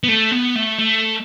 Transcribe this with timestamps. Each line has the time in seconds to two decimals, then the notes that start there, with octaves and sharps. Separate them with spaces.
0.03 B3
0.08 A3
0.31 B3
0.55 A3
0.79 A3